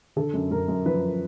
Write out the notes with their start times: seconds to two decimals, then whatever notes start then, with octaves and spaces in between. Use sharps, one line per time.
0.16 D3 A4
0.34 F#2
0.51 F#2 A#4
0.68 F#2
0.86 F3 B4